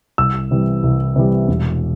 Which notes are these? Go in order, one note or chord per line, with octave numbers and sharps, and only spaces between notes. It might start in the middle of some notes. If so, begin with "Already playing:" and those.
C2 E6
C3 E3 G3
C2
C3 E3 G3
E1